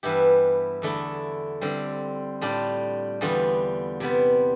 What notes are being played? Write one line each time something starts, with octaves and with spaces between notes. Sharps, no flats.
G2 E3 B3 E4 G4
E2 D3 A3 E4
D3 G3 C4
A2 G3 D4 F4
E2 D3 G3 B3 F4
C3 G3 B3